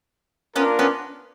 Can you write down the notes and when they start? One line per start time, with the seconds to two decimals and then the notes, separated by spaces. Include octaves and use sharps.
0.56 A#3 B3 C#4 D4 F4 A#4
0.79 B3 C#4